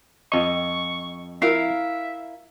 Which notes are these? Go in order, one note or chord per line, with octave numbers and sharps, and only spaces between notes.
F2 D#5 C#6
E4 A#4 E5 F5